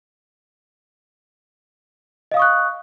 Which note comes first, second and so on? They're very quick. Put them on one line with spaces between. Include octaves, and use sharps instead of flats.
D#5 F5 D#6 C#6 F#6